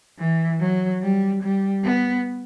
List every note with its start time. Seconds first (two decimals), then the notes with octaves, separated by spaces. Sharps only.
0.19 E3
0.60 F#3
1.02 G3
1.43 G3
1.84 B3